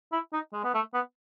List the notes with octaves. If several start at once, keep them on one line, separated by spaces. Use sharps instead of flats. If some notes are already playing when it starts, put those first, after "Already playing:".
E4
D#4
G#3
B3
A3
B3